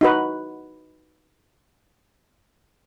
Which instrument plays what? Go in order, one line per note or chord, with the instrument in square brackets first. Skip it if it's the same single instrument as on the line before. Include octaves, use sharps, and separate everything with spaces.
[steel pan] D#4 F#4 B4